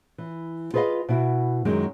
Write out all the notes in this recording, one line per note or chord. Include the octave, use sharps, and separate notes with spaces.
E3
F4 G#4 B4 C#5 D#5 F5
B2 E4 F#4
F#2 D#3 F#3 G#3